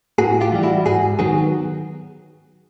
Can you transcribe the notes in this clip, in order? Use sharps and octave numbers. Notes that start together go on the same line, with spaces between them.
A2 F#4 G#4
F4 G4
E3 G3
E4 F#4
G#2 F#4 G#4
D#3 F#3 B3 F#4 G#4